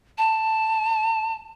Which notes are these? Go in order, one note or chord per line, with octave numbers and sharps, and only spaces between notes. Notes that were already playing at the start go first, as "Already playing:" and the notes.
A5